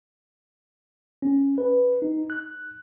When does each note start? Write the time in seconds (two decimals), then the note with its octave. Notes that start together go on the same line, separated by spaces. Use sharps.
1.22 C#4
1.58 B4
2.02 D#4
2.30 F#6